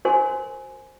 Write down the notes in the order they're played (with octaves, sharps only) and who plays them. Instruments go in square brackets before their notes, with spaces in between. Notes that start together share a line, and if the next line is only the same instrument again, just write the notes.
[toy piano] F#4 A#4 C5 G#5 C6